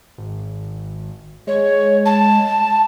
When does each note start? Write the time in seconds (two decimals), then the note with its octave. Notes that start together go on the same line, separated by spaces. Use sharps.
0.18 G#1
1.47 G#3 C#5
2.05 A5